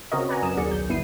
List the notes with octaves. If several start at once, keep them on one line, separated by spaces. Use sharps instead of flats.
C#3 C4 F#4 A#4 C#5 D#5
B4 D5 F#5 G#5 A#5
F#2 D#6 E7
D#2 F#3 G#4 A#4 D5 C#7
B1 G6
G1 B3 E4 C7 D#7